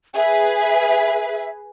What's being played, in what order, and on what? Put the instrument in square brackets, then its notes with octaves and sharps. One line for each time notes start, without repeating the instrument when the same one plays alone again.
[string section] G#4 B4 [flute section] E5